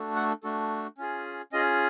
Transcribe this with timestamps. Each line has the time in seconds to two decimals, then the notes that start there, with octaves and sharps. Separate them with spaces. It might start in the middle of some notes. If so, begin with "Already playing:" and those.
Already playing: A3 D4 F#4 A4
0.16 F#5
0.43 A3 D4 F#4 A4
0.98 C#4 F4 G#4
1.53 C#4 F4 G#4 D#5